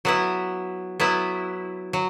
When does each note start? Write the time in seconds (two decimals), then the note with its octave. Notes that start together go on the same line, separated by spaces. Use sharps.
0.05 F#3 B3 E4
1.00 F#3 B3 E4
1.93 F#3